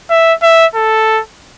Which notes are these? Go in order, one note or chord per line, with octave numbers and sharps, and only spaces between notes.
E5
E5
A4